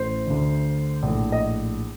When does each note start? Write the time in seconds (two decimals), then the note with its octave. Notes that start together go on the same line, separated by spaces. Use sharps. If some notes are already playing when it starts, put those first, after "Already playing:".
Already playing: A1 A2 C5
0.26 D2 D3
1.03 A#1 A2
1.32 D#5